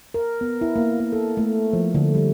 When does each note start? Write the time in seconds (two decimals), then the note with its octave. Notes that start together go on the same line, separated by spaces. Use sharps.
0.14 A#4
0.41 B3
0.61 E4
0.76 A#3
1.00 A#3
1.13 A4
1.37 A3
1.73 F3
1.95 D3
2.15 G3